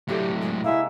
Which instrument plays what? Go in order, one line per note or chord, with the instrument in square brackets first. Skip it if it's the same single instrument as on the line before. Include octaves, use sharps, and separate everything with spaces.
[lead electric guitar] A2 F#3 [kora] C3 A3 D4 [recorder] G4
[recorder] G#3
[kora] C3 G#3 A#3 [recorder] E4 [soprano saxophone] E5